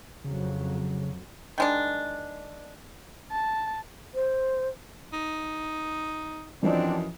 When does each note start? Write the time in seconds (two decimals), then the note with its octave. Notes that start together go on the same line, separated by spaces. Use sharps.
0.24 F2 C#3 F#3
1.58 D#3 G#3 D4
3.31 A5
4.15 C5
5.13 D#4
6.62 F#2 E3 F3 C4 D4 D#5